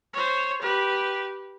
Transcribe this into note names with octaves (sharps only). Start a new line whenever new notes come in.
C5 C#5
G4 B4